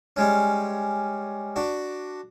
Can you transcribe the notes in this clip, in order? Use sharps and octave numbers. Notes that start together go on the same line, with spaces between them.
G3 G#3 C#4
D4 F#4